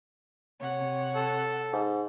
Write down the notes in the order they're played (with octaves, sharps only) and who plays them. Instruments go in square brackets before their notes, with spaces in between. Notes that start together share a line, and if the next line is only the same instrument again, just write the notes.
[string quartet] C3 C#5 F#5
[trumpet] A4
[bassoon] G#2